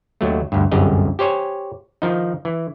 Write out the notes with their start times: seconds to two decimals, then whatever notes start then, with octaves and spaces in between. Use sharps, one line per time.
0.21 D#2 F#3 A3
0.52 D2 G2
0.72 G1 C2 F#2 G4 G#4 D#5
1.19 G4 C5 C#5 G#5
2.02 D#3 F3 D#4
2.45 E3